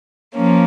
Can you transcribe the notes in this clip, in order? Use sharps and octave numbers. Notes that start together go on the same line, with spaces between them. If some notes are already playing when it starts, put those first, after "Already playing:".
F3 A#3 C#4